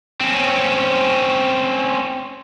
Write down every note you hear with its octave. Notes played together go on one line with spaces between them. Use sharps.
C4 C#4